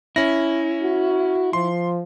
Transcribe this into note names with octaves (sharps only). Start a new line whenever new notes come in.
C#4 E4 A#6
F#4
F3 C6